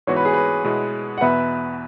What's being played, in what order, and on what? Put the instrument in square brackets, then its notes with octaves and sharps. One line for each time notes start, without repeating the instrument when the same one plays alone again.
[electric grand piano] G#2 E3 B3 F#4 [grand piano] C#5
[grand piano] B4
G#4
B4
[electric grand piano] B2 G#3 B3 E4
[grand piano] F#5
[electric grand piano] E2 B2 B3 [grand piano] B4 E5